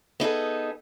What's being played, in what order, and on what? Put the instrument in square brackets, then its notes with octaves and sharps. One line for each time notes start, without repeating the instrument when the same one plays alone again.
[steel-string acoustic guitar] B3 D#4 G#4 A4